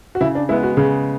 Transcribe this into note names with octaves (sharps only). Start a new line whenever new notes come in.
F#4
C#3 E4
D4
G#3 B3 E4
F#4
C#3 G#4